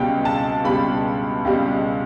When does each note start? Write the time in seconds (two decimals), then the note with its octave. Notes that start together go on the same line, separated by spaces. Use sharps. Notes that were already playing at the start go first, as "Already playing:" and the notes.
Already playing: C#2 B2 G3 G5
0.25 A5
0.64 C#2 B2 G3 B5
1.45 C#2 B2 G3